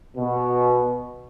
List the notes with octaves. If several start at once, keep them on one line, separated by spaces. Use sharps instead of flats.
B2